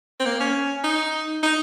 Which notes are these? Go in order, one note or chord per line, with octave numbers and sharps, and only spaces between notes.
C4
A#3
C#4
D#4
D#4